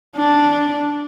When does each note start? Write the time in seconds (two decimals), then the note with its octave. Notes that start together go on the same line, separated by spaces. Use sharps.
0.16 D4